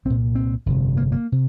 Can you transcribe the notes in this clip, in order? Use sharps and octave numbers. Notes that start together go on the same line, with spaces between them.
C2 A#2 C4
C4
G1 F2 C3
A#3
A#3
C3